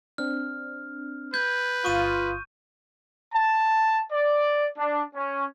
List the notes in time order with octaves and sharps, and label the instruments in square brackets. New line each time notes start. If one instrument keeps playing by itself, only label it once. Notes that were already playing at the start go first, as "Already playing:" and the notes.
[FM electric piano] C4 D4 [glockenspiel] F6
[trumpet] B4 [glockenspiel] G6 [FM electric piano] G#6
[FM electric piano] G1 D#6 [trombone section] F4 [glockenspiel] C#6 D#7
[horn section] A5
D5
D4
C#4